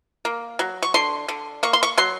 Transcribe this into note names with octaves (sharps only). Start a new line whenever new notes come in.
A#3
F#3
C#6
D3 C6
D3
A#3 C#6
C6
C#6
F#3 C6